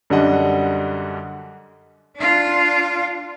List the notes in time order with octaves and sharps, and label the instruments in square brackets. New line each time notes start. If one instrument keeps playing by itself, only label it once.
[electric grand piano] F#2 D3 G3 D4 D#5 F#5
[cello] D4 F4